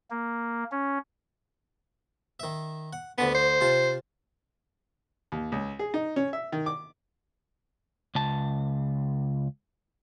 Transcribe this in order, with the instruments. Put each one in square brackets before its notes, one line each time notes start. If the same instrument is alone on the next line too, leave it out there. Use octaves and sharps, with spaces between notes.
[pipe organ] A#3
C#4
[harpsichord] D#3 E5
F#5
[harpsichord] D2 D3 A5 [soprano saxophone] B3
[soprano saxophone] C5
[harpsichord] C3 F4 A5
[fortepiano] D#2
C#2
G#4
D#4
C#4
E5
D#3
D6
[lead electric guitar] C#2 A5